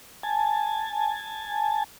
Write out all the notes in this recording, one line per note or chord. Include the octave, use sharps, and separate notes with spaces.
G#5 A5